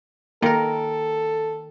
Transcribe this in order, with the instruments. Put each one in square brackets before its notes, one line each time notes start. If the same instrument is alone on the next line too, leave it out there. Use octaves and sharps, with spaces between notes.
[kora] D#3 A#4 [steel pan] A#3 [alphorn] A4